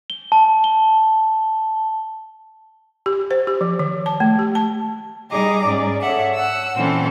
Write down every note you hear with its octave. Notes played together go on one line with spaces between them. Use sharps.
G7
A5
G7
G4
C5
G4
F3
D#3
A5
A3
G4
A5
G3 D#4 G#4 D#5 A#5 D6
G#2 C#4 G#4 D5
A4 C#5 E5 F#5
F#5 E6
A#2 E3 C4 C#4 A4